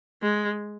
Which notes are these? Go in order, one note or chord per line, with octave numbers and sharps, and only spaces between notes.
G#3